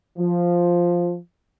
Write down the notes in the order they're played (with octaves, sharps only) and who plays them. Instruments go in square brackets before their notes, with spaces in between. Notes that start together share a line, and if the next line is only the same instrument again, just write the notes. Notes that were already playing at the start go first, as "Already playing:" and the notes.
[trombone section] F3